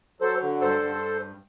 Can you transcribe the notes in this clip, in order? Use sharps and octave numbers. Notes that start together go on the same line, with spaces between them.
F#3 A4 C5
D3
G2 A4 C5
G2